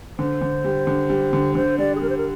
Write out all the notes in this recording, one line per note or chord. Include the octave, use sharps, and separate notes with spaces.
D3 C5
D3
G3
D3
G3
D3
D3 C5
G3 D5
G#4
G3 A#4
C5
A#4